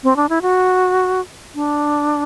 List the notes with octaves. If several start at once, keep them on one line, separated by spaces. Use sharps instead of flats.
C4
D4
E4
F#4
D4